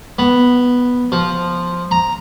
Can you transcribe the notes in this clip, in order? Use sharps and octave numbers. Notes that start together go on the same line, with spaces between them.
B3
F3
A#5